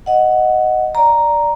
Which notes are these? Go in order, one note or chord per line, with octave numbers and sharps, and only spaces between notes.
D#5 F#5
D5 A#5